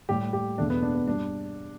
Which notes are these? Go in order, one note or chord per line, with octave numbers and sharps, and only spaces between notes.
A2 G3 G4
G4
E2 B2 A3 D4
B3
D4
B3
G2 G3 D4